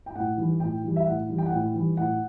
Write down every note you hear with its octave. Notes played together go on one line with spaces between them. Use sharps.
G5
A2 F#5
E3 G3
A2 G5
E3 G3
E5
A2 F#5
E3 G3
G5
F#5
A2 G5
E3 G3
A2 F#5